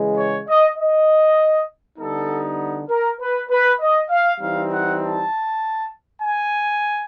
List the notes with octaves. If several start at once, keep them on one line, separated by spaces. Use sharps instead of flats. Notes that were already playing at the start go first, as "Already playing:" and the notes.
Already playing: C#3 E3 G#3
C#5
D#5
D#5
D3 G3 B3 D#4 A4
A#4
B4
B4
D#5
F5
E3 G3 C4 D#4 F5
F#5
A5
G#5